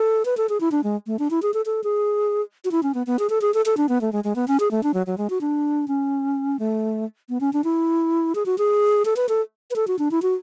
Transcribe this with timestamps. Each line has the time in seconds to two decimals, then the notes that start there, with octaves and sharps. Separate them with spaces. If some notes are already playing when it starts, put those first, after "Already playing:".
Already playing: A4
0.25 B4
0.37 A4
0.49 G#4
0.60 E4
0.72 D4
0.84 G#3
1.07 A3
1.19 D4
1.30 E4
1.42 G#4
1.54 A4
1.66 A4
1.84 G#4
2.65 F#4
2.71 E4
2.83 C#4
2.94 B3
3.07 B3
3.19 G#4
3.30 A4
3.41 G#4
3.54 A4
3.66 A4
3.77 D4
3.89 B3
4.01 A3
4.12 G#3
4.24 G#3
4.36 B3
4.48 C#4
4.60 G#4
4.71 A3
4.83 D4
4.94 F#3
5.07 F#3
5.18 G#3
5.30 F#4
5.41 D4
5.88 C#4
6.59 A3
7.29 B3
7.40 C#4
7.53 D4
7.64 E4
8.35 G#4
8.46 F#4
8.58 G#4
9.05 A4
9.16 B4
9.29 A4
9.71 B4
9.76 A4
9.87 F#4
9.99 D4
10.11 E4
10.22 F#4